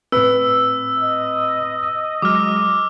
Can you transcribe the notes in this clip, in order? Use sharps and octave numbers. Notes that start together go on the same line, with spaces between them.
A2 C4 B4 E6
D#5
F#3 G#3 D6 F6